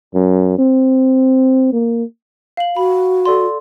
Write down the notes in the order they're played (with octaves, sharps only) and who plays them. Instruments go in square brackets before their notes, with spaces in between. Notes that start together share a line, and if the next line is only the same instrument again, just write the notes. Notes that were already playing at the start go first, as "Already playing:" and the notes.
[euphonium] F#2
C4
A#3
[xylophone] F5 F#7
[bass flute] F#4 [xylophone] B5
[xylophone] A4 D5 C6